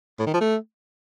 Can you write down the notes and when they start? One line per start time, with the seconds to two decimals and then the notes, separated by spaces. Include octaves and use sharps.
0.19 A2
0.26 D#3
0.34 F3
0.41 A3